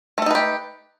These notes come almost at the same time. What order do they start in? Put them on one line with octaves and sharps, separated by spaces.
A3 A4 D#4 B4 G4